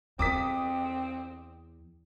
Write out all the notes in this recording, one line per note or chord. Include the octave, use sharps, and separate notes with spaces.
E2 C4 D6 D#6 B6